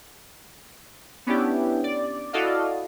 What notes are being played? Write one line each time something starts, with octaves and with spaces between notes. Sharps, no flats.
B3 C#4 D4 E4 G4
D5
E4 F#4 A4 D5 D#5 F5